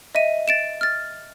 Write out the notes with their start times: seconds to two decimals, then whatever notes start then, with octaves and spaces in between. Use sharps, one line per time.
0.15 D#5 E5 D#7
0.48 A6 D7 E7
0.81 F6 A6